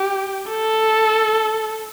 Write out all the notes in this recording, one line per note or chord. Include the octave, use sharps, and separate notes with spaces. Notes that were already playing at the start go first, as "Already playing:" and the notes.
Already playing: G4
A4